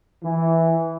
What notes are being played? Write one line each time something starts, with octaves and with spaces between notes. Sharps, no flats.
E3